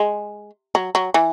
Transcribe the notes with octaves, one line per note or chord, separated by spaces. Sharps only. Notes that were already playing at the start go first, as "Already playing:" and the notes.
Already playing: G#3
F#3
F#3
E3